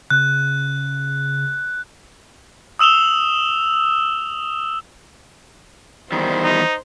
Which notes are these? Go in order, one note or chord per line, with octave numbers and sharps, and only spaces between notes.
C#3 F#6
D#6 E6 E7 F7 G7
E2 D#3 G3 C5
D#4